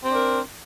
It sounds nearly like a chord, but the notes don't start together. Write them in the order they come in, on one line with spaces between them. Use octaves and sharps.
C4 D4 A#4